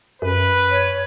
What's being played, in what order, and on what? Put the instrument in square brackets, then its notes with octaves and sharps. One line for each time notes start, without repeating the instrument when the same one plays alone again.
[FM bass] F#2 [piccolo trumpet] B4
[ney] C#5